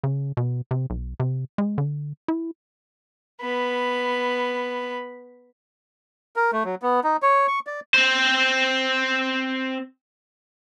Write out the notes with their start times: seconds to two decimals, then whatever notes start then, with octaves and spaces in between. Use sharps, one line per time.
0.04 C#3
0.37 B2
0.71 C3
0.90 B1
1.20 C3
1.58 G#3
1.78 D3
2.28 E4
3.41 B3 B5
6.36 A#4
6.53 A3
6.64 F#3
6.82 B3
7.04 D#4
7.22 C#5
7.48 C#6
7.67 D5
7.94 C4 C5